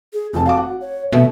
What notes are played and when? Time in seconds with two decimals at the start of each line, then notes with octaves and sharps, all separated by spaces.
0.13 G#4
0.33 F1 F4 A5
0.46 F#4 F5 A5 D6
0.57 F#5
0.81 C#5
1.13 B2 A3 E5